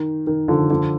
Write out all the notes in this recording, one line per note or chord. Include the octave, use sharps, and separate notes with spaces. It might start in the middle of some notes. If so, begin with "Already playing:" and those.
Already playing: D#3
D#3
D3 F3
D3 F3